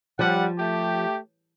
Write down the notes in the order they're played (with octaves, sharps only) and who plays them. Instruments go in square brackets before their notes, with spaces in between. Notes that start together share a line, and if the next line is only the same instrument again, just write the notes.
[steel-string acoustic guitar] F3 [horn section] G3 F#5
[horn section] A3 G4